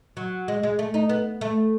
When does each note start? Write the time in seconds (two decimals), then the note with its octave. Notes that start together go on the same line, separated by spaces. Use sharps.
0.17 F#3
0.48 G#3
0.63 G#3
0.79 A3
0.94 D#4
1.09 B3
1.41 A3